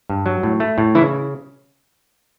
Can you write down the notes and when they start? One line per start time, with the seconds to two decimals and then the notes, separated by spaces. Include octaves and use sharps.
0.10 G2
0.26 F#3
0.43 A2
0.60 A3
0.78 A2
0.95 C#3 E3 E4